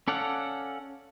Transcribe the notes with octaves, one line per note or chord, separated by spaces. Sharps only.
C#4 A4 D5 F5 F#5